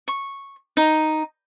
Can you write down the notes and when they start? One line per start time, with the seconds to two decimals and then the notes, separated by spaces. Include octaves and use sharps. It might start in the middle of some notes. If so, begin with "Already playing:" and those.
0.08 C#6
0.77 D#4